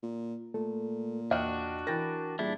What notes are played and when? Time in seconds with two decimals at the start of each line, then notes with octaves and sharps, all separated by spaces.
0.03 A#2
0.54 A#2 A3 A4
1.31 E2 D4 F#4 D#5 G5 F6
1.87 E3 A#4 G5 A6 A#6
2.39 A#2 G3 D4 E4 G#4 E5